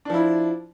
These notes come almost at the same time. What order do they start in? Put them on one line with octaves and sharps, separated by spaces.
D4 F3 E4